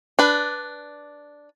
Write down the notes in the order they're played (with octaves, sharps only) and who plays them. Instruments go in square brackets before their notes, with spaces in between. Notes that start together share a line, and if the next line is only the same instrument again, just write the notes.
[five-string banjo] D4 B4